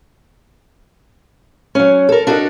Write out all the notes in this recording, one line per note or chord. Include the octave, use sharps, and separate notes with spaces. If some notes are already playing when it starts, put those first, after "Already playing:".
F#3 C#4
A4 A#4
D4 F#4 A4 A#4 D#5